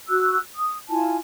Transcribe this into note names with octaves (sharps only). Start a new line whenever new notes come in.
F#4 E6 F#6
D#6
E4 F4 G#5 A5